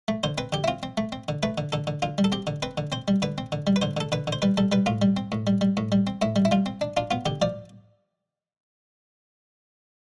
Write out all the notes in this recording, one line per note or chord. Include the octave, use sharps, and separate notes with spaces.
A3
D3 C5
C4 B4
D3 G4
E4
C4 F4
C4
A3
C4
D3
A3 B4
D3
D3 A4
D3
D3 F4
G3
A4
C4 G4
D3
C4 B4
D3
C4 C5
G3
D3 B4
C4
D3
G3
B4
D3 C5
D3 A4
D3 B4
D3
C5
G3 B4
G3 A4
G3 B4
A2 F4
G3
C4
A2
G3
G3
A2
G3
C4
A2 E4
G3
E4
G3 F4
C4
D4
D4 F4
B3 F4
D3 G4
F3 D5